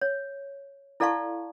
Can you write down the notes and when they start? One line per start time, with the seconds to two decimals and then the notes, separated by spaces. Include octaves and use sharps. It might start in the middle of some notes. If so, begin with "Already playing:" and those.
0.01 C#5
1.00 E4 A4 D5 F5 A5 C#6